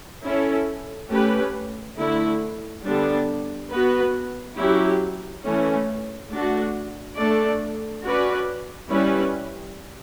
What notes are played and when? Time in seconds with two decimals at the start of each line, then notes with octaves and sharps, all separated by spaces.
0.24 C#4 E4 A4
1.11 A3 C#4 G4 B4
1.98 D3 A3 E4
2.84 D3 G3 B3 D4
3.71 B3 F#4 B4
4.58 F#3 C#4 E4 G4
5.44 E3 A3 C#4
6.31 A3 D4 F#4
7.17 A3 D4 A4 D5
8.04 C#4 F#4 B4 D5
8.90 G3 C#4 E4 B4